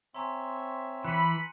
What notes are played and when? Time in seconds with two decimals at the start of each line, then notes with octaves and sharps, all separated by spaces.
0.14 C4 C#5 E5 G#5 A#5 C6
1.05 E3 B5 F#6 C#7 D#7